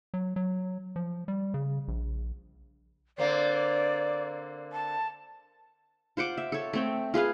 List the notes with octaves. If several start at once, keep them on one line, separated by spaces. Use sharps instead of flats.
F#3
F#3
F3
G3
C#3
A#1
D3 A#3 C4 D5
A5
F4 C5 F#5 D6
E5
A4 C#5
A3 C4 G5
F4 G#4 B4 F5